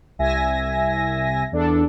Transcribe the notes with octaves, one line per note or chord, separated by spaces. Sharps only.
C2 E5 G#5 A#6
E2 D4 A4